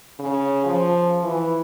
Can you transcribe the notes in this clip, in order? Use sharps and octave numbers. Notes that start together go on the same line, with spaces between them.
C#3
F3
E3